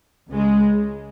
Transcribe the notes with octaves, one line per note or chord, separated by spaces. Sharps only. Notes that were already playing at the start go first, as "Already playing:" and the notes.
C#2 C#3 G#3